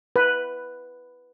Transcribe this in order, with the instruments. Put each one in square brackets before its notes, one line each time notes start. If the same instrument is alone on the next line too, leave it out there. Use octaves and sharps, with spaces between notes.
[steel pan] B4